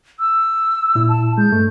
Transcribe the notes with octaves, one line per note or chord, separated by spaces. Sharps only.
E6
A#2 E4
A5
G#3 G6
G2 A3